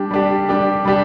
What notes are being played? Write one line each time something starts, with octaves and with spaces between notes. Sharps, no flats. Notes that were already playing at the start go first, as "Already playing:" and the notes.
Already playing: G3 D4 G4
G3 D4 G4
G3 D4 G4
G3 D4 G4